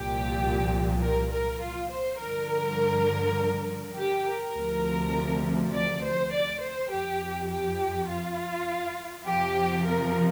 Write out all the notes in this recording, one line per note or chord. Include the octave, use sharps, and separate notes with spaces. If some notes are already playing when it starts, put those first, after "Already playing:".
Already playing: C2 A#2 F3 G4
A#4
A#4
F4
C5
G2 D3 F3 A#4
G4
A#4
D2 C3 F3
D5
C5
D5
C5
F2 F3 G4
G4
F4
F2 C3 F3 G4
A#4